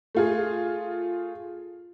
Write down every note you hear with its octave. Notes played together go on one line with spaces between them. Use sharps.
A3 F4 G#4